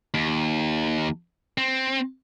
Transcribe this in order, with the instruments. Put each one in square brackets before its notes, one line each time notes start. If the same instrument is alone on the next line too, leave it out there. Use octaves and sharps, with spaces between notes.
[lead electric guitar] D#2
C4